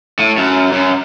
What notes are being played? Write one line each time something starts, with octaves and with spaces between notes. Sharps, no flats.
A2
F#2
F#2